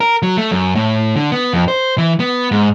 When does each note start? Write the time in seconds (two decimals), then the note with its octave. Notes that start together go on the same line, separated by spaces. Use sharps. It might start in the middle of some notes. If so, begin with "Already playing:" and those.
0.01 A#4
0.22 F#3
0.37 A3
0.51 F#2
0.75 A2
1.16 D3
1.32 B3
1.54 F2
1.68 C5
1.98 E3
2.20 B3
2.52 G#2